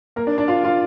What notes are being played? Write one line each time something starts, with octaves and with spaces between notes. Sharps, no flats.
A#3 A#4
D4 D5
D4 D5
F4 F5
F4 F5